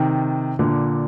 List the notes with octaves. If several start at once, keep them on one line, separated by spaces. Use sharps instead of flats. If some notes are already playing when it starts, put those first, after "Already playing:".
Already playing: C3 D#3
A#2 D3